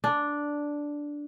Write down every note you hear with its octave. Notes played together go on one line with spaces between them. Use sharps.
D4